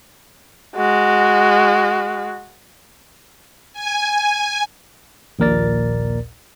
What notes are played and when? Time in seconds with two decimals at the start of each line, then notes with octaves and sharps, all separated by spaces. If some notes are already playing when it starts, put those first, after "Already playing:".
0.76 G#3 F#4
3.73 G#5
5.39 A#1 D#2 A#2 A#4 D5 A6